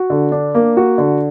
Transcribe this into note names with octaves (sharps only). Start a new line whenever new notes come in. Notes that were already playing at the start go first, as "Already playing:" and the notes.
Already playing: F#4
D3
D4
A#3
F#4
D3